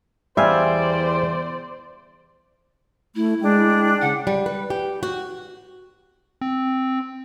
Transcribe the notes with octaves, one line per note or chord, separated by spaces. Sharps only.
E2 G3 C5 D5 E5 F5 G#5
A3 E4
G#3 D4 G5
C#3 F#5
G3
B4
G4
F#4
C4